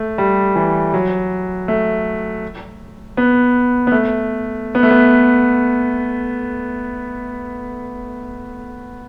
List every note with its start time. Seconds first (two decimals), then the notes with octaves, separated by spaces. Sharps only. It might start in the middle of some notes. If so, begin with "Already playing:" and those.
Already playing: A3
0.18 G3
0.56 E3
0.94 F#3
1.68 A3
3.17 B3
3.87 B3
3.92 A3
4.75 B3
4.83 A3
4.91 B3